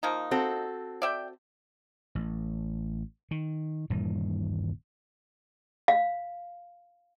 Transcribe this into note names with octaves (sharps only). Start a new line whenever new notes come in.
F3 A#3 D#4
C4 F#4 A4
D5 E5 G5
A1
D#3
D#1 G2 A#2 E3
F5